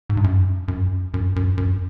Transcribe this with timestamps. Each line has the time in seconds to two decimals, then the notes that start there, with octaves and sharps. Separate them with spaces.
0.10 G#2
0.17 G2
0.24 F#2
0.68 F#2
1.14 F#2
1.36 F#2
1.57 F#2